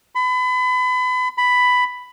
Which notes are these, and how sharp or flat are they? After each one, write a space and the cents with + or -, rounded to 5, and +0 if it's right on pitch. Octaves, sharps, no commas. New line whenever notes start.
B5 +30
B5 +5